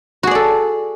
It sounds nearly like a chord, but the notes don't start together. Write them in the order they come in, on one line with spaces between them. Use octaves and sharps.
F#4 G#4 D5 A4